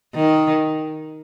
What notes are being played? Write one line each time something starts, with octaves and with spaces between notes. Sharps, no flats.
D#3